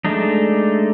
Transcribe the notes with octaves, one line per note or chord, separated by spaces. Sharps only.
G#3 A3 D4 D#4